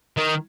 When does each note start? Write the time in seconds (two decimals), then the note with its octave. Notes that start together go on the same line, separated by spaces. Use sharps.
0.17 D#3